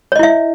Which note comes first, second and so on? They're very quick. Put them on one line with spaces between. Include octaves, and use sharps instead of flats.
C#5 D#5 E4 E5